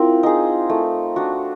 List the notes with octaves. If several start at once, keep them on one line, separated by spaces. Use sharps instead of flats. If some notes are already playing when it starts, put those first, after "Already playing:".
Already playing: C4 E4 F4 A#4
D#4 G#4
A3
D4 F#4